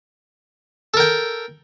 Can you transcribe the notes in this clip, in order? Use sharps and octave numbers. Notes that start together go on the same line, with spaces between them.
A4 A#4 G5